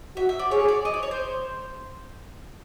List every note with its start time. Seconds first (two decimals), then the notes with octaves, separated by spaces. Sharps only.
0.17 F#4 E5
0.29 E5
0.39 D5
0.51 G#4 C#5
0.68 D5
0.85 D#5
0.94 D5
1.03 C#5
1.11 C5